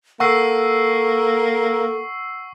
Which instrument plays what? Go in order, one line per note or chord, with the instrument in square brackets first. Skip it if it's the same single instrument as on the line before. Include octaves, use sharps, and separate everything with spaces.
[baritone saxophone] A#3 [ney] A4 [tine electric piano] F#5 [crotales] C#6 E6 C7